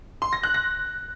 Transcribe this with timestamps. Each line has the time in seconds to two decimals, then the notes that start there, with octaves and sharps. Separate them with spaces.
0.22 C6
0.33 A#6
0.43 F#6
0.54 A#6